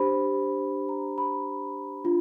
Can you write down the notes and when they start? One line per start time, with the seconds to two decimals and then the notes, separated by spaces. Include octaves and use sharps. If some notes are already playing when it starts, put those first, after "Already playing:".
Already playing: D4 G4 C5 B5
0.89 A#5
1.18 B5
2.04 D4 F4